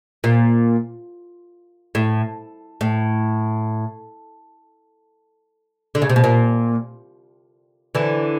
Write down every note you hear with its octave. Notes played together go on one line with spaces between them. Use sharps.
A#2
A2
A2
D3
C#3
C3
B2
A#2
D3 E3